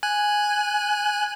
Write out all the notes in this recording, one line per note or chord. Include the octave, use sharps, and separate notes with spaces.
G#5 F#6